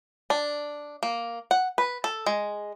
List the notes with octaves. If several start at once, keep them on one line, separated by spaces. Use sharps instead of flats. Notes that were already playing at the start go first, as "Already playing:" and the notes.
D4
A#3
F#5
B4
A4
G#3